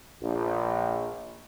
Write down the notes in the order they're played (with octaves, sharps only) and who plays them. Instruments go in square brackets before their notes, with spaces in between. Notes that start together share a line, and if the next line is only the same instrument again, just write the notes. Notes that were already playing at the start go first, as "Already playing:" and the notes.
[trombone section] A#1